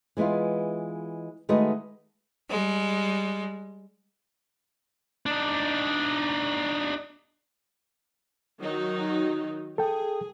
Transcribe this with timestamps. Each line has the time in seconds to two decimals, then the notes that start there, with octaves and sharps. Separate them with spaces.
0.17 E3 G#3 B3 E4 F4
1.49 D#3 G#3 A3 F#4 B4 D#5
2.50 G3 G#3
5.26 D4 D#4
8.58 D#3 F#3 D#4
9.78 G#4 A4 G5